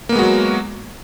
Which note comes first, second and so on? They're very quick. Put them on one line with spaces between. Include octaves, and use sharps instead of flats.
A#3 B3 G#3 F#4 F#3